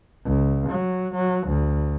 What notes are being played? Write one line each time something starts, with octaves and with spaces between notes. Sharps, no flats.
C#2
F#3
F#3
D2